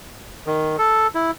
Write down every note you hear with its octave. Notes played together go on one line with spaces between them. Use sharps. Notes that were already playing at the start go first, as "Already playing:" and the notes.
D#3
A4
E4